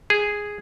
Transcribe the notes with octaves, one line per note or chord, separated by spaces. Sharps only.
G#4